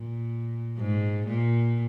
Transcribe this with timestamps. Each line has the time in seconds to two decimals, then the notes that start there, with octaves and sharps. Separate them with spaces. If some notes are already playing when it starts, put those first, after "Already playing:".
Already playing: A#2
0.77 G#2
1.28 A#2